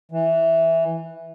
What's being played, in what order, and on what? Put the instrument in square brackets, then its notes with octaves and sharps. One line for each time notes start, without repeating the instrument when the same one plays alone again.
[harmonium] E3